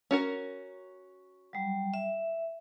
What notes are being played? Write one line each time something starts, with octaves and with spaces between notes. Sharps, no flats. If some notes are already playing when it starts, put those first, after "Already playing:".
C#4 F#4 A#4
F#3 G3
E5